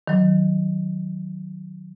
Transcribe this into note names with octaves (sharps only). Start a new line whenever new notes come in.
D#3 F#3